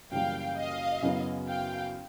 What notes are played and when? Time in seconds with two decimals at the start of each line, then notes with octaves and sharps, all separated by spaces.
0.11 F#2 C#3 E3 G3 A#3 F5 G5
0.57 D#5 F5
1.02 F#2 C#3 F#3 B3 E4
1.47 F5 G5